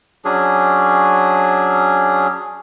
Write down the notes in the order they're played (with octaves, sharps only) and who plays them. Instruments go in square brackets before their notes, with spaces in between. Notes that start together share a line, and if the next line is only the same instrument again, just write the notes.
[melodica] F#3 C#4 D4 G#4